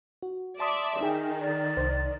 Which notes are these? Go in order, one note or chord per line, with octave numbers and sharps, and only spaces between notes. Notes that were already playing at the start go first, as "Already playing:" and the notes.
F#4
D5 E5 A5 C6 D#6
D#3 D#4 G#4 G5
D5
C2 C5